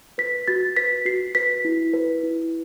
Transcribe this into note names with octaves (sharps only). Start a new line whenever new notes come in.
B4 B6
F#4 A6
B4 B6
F#4 C7
B4 B6
E4
B4
E4